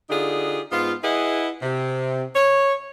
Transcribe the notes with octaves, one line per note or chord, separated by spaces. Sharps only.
D3 D#4 F4 G4 G#4
G#2 B3 F4
E4 G#4 B4 D#5 F#5
C3
C#5